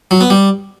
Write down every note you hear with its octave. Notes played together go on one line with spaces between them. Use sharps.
F#3
B3
G3